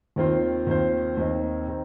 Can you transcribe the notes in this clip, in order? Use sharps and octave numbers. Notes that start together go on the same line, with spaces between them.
D#2 D#3 C4 F4 C5
D#2 D#3 C4 F4 C5
D#2 D#3 C4 D#4
D#3 C4 D#4